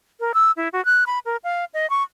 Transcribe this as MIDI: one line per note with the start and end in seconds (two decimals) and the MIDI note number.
0.20 0.32 70
0.34 0.52 88
0.57 0.69 64
0.73 0.84 66
0.85 1.04 90
1.07 1.19 83
1.25 1.37 70
1.44 1.65 77
1.74 1.89 75
1.90 2.03 85